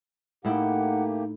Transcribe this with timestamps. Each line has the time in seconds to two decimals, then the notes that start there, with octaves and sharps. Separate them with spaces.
0.45 A2 A3 A#3 D#4 E4 G4 F#5 G5